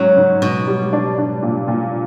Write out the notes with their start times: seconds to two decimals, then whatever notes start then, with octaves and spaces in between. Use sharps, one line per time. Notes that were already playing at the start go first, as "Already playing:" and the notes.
Already playing: G#2 F#3 C#4
0.17 G#2
0.42 G#2 B2
0.67 G3
0.93 D4
1.18 D4
1.42 A#2
1.68 A#2